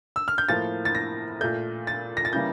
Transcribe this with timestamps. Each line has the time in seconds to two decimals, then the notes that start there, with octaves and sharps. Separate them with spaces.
0.16 E6
0.28 F6
0.38 G6
0.49 A2 F3 A#3 A6
0.85 A6
0.95 A#6
1.41 A#2 A3 G6
1.87 A6
2.17 A#6
2.25 A6
2.33 C#3 E3 G3 A#3 G6